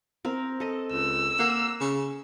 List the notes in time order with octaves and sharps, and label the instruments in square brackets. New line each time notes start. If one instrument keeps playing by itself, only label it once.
[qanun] C4 A#4
A4 D#5
[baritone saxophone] C#2 [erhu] E6
[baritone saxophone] A#3 [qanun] A#4 F#5
[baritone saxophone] C#3